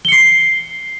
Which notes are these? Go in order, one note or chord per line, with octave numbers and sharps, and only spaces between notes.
C7 C#7 G7